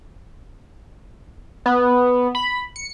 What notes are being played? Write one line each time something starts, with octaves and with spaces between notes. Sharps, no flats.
B3
B5
C#7